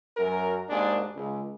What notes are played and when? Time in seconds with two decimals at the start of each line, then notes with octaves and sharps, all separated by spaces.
0.17 F#2 A#4
0.70 G#1 D#2 G#3 D4
1.15 C#2